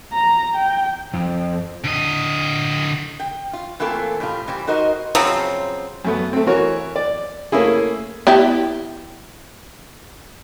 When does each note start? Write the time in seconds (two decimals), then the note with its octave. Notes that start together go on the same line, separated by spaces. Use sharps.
0.13 A#5
0.56 G5
1.14 F2
1.84 D3 D#5
3.20 G5
3.53 F4
3.80 E3 A3 A#3 C4 F4 A4
4.20 A2 G3 F4
4.47 E3 G3 C5
4.67 D#4 F#4 A#4 C5 D#5
5.15 C#3 F3 F#3 C4
6.05 F#2 A3 B3
6.33 A3 C4
6.46 E3 F#4 A#4 C#5
6.96 D5
7.52 A3 A#3 C#4 E4 G#4
8.27 B3 E4 G4